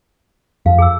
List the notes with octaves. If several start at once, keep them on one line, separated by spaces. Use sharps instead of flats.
F2 F5
G#4 A5 E6